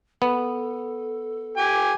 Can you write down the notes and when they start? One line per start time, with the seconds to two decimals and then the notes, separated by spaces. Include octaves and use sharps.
0.22 B3 A4
1.57 G4 G#5